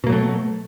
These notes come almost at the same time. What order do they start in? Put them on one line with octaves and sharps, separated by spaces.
B2 A#3 F#3 A3